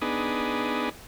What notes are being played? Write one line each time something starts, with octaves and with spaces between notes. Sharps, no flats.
B3 D4 D#4 G#4